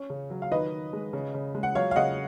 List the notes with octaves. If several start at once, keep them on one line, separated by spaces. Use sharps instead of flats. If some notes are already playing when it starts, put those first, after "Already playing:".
Already playing: C#4
C#3
F#3
F5
D#3 B4 D#5
D#3
G#3
C#3
C#3
G#3
F#5
F#3 C#5 F5
F5
C#3 D#5 F#5